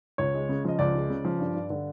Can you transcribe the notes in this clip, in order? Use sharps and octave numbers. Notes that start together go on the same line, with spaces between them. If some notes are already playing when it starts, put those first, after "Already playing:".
C#2 C#5
G#3
C#3
F3 D#5
C#2 D5
G#3
C#3
F3
G2
G2
D3